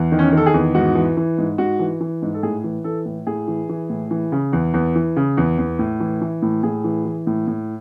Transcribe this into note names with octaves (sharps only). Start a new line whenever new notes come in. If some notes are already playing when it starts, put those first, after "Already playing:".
Already playing: E2
D#3
C#4
D#3 A4
G#4
E2
G#2 F#4
E3
E3
G#2
G#2 F#4
E3
E3
G#2
A4
A2 G#4
E3
E3 A4
A2
A2 G#4
E3
E3
A2
E3
C#3
E2
E2
E3
C#3
E2
E2
A2
E3
E3
A2
A2 G#4
E3
E3
A2
A2